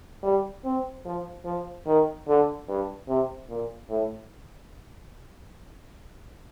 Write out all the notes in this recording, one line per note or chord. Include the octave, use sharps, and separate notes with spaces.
G3
C4
F3
F3
D#3
D3
G2
C3
A#2
A2